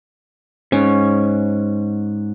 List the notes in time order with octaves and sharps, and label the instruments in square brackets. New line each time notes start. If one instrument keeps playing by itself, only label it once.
[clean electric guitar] G#2 [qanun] C#4